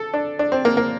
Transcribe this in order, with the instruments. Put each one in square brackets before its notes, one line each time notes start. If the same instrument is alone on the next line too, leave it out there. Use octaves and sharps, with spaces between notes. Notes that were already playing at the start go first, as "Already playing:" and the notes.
Already playing: [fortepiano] A4
D4
D4
C4
A#3
A#3